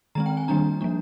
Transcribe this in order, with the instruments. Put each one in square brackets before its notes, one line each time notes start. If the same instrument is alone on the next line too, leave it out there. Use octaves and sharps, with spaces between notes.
[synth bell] D#3 G#3 C4 A#5
G5
G#5
D#3 G3 A#3 D4 A#5
F3 A#3 D4